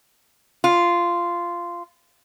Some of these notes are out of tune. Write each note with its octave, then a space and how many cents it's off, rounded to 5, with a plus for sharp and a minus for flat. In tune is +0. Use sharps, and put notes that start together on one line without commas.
F4 -10